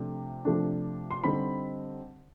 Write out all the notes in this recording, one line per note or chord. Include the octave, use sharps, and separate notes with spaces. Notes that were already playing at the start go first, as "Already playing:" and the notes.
Already playing: C3 F3 A3 D4
C3 F3 A3 D4
C6
D3 G3 C4 D#4 B5